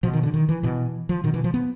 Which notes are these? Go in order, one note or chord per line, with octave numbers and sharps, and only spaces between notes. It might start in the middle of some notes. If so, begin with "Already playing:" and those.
B2 F3
D#3
D3
D#3
E3
B2 E3
F3
B2 D#3
E3
F3
B3